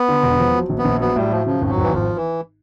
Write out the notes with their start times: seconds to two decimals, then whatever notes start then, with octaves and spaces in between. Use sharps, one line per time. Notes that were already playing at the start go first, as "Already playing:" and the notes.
Already playing: B3
0.09 D3
0.23 E1
0.39 F3
0.54 F#3
0.69 A#1
0.78 B3
0.85 A#1
1.00 F#3 B3
1.16 A2 G3
1.31 F3 F#3
1.46 C#3 F3
1.62 G#1
1.70 F#3
1.78 G#1 E3
1.93 G#1 F3
2.16 E3